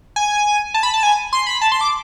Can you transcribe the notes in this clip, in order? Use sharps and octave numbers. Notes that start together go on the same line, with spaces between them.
G#5
A5
B5
A5
G#5
C6
B5
A5
C6
D6